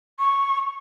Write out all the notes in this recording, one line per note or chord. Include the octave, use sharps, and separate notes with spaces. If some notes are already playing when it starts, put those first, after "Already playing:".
C#6